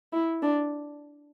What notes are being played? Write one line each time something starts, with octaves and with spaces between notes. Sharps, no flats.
E4
D4